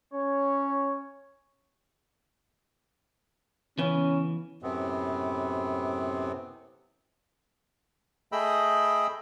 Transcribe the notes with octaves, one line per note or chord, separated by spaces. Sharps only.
C#4 C#5
C#3 E3 B3 C#4
F#2 A2 C3 B3 C4
A3 G#4 D#5 G5 B5 E6